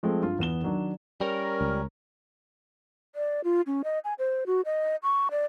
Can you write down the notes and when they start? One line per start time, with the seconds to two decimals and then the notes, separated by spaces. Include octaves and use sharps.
0.03 F3 G#3 A3 C4
0.22 G2 F4
0.39 E2 B3 E7 G7
0.62 D#3 F#3 D4
1.21 G3 C#4 A#4
1.61 C#2
3.15 D5
3.44 F4
3.67 C#4
3.84 D#5
4.04 G#5
4.19 C5
4.46 F#4
4.65 D#5
5.03 C#6
5.31 D5